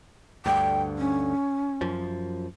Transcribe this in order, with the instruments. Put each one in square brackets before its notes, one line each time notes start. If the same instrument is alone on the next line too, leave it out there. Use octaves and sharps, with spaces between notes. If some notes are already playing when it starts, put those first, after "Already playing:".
[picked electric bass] D2 G2 D3 [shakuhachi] G5
[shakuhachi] C#4
[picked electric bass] F#2 F3